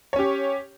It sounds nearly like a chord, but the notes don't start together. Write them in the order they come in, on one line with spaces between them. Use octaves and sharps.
C#5 C#4 G4